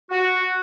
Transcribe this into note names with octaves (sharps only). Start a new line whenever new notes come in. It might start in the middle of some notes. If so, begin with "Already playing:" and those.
F#4